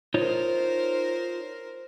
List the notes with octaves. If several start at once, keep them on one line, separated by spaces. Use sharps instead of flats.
D#4 F4 A#4 C5 C#5